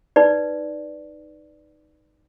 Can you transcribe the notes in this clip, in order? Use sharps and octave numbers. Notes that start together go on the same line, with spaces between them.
D#4 B4 D5